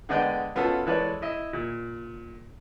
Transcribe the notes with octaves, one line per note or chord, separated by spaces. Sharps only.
D3 G#3 B3 D5 D#5 G5
B2 B3 C#4 F4 A4
E3 G#3 A4 B4 C#5 D5
E4 D#5 E5
A#2